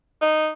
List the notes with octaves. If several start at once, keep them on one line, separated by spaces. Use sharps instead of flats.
D#4